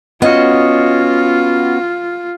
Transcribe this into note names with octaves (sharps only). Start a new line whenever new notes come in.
B3 C#4 F4 F#4 D#5